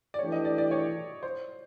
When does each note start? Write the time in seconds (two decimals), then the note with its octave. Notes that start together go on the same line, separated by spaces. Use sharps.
0.14 D5
0.18 E3 A3 D4 G4 C#5
0.32 D#5
0.45 D5
0.58 D5
0.71 C#5
1.23 C5